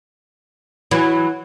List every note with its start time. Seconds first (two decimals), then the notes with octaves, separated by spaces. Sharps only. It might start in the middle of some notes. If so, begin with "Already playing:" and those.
0.91 E3 F#3